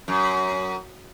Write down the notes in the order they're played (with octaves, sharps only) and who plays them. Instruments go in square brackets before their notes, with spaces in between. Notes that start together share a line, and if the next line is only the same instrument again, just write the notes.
[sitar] F#2